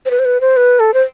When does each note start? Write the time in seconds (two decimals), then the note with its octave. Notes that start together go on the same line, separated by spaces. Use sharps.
0.06 C5
0.11 B4
0.19 C5
0.25 B4
0.41 C5
0.57 B4
0.80 A4
0.94 C5